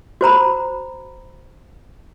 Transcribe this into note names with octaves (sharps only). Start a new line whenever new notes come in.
F#4 C5 A#5 B5